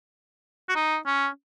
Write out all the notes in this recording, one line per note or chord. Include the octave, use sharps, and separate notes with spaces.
F#4
D#4
C#4